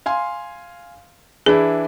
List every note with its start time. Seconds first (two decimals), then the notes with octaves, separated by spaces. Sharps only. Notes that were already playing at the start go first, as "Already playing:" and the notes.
0.06 F5 G#5 C6
1.46 E3 D4 E4 G#4